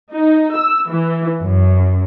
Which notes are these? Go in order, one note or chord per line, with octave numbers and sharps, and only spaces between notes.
D#4
E6
E3
F#2